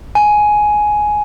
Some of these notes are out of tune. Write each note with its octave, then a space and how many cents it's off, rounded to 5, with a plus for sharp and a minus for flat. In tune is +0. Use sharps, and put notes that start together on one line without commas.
G#5 +10